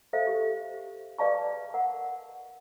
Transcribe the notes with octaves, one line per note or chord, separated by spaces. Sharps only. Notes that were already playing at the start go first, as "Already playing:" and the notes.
A4 C5 E5 F5
G4
G#4 B4 D5 F5 A5 C#6
A#4 F#5